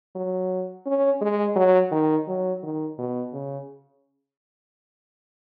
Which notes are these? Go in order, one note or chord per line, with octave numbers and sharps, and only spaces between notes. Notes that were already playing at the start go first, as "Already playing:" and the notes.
F#3
C#4
G#3
F#3
D#3
F#3
D#3
B2
C#3